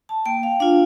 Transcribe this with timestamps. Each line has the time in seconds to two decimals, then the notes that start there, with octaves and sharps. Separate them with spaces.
0.09 A5
0.26 A#3 G5
0.43 F5
0.60 D4 F4 F5